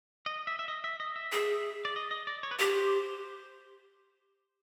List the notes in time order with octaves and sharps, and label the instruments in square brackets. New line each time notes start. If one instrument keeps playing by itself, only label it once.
[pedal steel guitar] D#5
E5
E5
D#5
E5
D#5
E5
[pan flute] G#4
[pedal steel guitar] D5
D#5
D#5
D5
C#5
B4
[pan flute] G4 [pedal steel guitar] C5